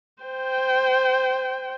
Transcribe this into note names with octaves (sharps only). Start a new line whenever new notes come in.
C5 G5